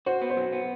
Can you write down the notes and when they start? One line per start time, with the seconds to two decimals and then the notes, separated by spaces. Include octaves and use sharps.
0.06 F#4 C5
0.22 B3
0.30 C5
0.37 F#3
0.53 B3